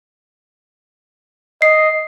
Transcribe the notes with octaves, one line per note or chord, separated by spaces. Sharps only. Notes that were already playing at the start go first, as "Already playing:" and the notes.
D#5 C7